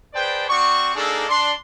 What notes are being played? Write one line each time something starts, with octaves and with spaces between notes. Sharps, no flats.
G#4 B4 C5 D5 G5 A5
C4 F#4 D5 C#6
A#3 D4 D#4 G#4 A4
D4 C6